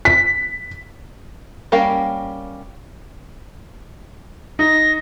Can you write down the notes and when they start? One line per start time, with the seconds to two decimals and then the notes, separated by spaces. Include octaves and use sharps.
0.05 B6
1.72 G3 A#3 C#4 A#4 F5
4.59 D#4 A#6